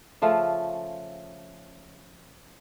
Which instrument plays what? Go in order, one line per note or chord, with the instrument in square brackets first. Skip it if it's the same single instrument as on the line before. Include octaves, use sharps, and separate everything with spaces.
[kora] C#3 F3 A3 F4